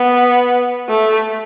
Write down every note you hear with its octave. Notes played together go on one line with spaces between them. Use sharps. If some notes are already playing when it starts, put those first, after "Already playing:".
Already playing: B3
A3